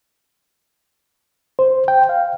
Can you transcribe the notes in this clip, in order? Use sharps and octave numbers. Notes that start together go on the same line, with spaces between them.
C5
G5
F5